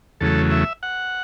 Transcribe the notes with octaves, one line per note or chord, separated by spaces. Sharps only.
E2 C#3 F#3 A3 A4
E5
F#5